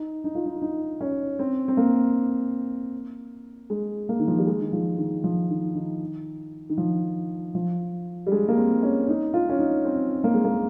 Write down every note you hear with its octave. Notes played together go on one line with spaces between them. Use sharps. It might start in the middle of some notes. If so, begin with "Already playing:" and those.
Already playing: D#4
D#4
F4
D#4
D#4
C#4
C4
C4
A#3
G#3
A#3
D#3
F3
G3
G#3
D#3
F3
D#3
F3
D#3
D#3
D#3
F3
F3
G3
G#3
A#3
C4
C#4
D#4
F4
C#4
D#4
C4
A#3
G#3
A#3